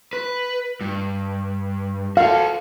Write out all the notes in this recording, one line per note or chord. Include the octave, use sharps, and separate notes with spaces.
B4
G2
F#4 A4 F5